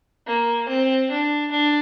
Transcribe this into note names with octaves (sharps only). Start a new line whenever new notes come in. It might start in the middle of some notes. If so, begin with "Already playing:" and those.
A#3
C4
D4
D4